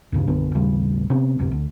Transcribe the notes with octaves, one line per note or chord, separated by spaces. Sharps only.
D2 G2 C#3
B1 F#2 D3 B3
A1 D#2 C#3 G3
C3 B3 C#4
D1 B1 F#2 C3
D2